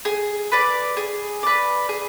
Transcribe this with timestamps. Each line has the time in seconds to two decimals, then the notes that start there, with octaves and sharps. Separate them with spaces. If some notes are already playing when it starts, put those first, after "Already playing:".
0.05 G#4
0.52 B4 D5
0.97 G#4
1.43 B4 D5
1.89 G#4